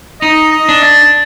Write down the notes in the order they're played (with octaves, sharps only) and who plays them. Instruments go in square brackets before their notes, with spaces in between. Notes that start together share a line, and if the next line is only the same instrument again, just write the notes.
[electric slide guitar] D#4 [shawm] D#5
[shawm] D#5
[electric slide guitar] D4
[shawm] A5